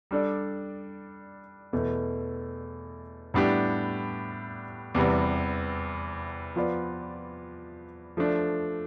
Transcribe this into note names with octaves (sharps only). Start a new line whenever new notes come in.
G3 D4 A4 D5
E2 B2 A3
A2 G3 B3 D4 G4
E2 C3 G3 B3
F3 B3 F4 B4 D5
F3 A3 D4